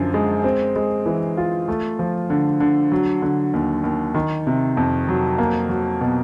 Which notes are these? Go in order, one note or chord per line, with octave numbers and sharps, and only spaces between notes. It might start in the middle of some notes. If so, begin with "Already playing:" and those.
Already playing: F#2 D3 F3
G#3
C4
G#3
E3
F4
A3
F3
D3
D3
F#3
D3
D#2
D#2
D#3
C3
F2
F#3
A#3
F#3
B2